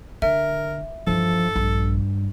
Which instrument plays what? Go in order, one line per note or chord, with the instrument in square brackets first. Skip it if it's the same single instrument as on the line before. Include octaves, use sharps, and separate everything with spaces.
[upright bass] D3 [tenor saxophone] A#4 [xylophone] E5
[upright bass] G2 E3 [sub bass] F3 [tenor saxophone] A4
[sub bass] A#1 [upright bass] G2